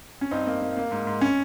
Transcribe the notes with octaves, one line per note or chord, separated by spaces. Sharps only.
C#4
G2 C4 D#4
A#3
A#3
A#3
G#2
G#2
C#4